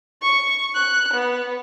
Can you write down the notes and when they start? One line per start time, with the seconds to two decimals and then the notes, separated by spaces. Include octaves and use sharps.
0.22 C#6
0.75 F#6
1.14 B3